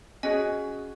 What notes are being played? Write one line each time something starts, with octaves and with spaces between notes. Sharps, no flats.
C#4 F#4 G#4 D#5 G#5